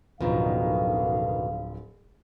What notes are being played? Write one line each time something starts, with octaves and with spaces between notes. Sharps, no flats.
D1 B1 F#2 B2 D3 D#3 F3 F5